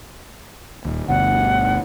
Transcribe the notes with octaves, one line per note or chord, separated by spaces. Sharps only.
D#1 D#2
G1 D2 B2 F#5